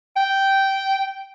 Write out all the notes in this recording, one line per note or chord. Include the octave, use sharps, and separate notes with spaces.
G5